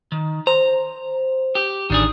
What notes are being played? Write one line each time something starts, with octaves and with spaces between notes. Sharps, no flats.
D#3
C5 A#5
G4
A1 D#3 D4 G#4